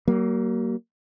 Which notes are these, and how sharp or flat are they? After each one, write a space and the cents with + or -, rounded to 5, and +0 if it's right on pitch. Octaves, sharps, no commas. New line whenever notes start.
F#3 +45 A#3 +0